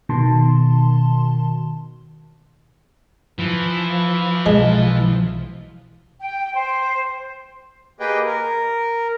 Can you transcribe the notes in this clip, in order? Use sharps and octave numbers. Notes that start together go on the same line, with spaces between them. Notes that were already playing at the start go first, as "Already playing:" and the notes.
B2 D#3 A5 C6
E3 F3
B1 B2 G#3
G5
C5
A#3 G4 G#4 B4 D#5 G5
A#4